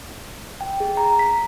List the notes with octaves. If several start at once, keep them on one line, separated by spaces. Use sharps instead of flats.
G5
G#4
A#5
B6